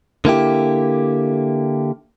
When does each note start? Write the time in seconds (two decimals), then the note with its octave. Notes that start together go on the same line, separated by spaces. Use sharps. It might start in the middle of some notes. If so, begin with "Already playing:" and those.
0.25 D3 A#3 E4 G4